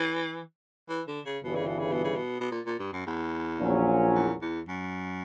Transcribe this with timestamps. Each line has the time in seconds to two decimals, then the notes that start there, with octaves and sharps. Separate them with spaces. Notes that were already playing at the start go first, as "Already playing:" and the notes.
Already playing: E3
0.89 E3
1.07 D3
1.25 C#3
1.44 G1 G2 B2 E3
1.55 C#3
1.67 B2
1.79 C#3
1.93 B2
2.04 C#3
2.16 B2
2.40 B2
2.51 A#2
2.66 A#2
2.79 G2
2.93 F#2
3.06 E2
3.60 A#1 A#2 F#3 C#4
4.15 E2
4.41 E2
4.68 F#2